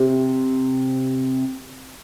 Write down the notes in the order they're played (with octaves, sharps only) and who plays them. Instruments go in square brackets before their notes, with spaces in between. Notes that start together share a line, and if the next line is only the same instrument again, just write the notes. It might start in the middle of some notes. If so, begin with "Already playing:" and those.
Already playing: [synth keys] C3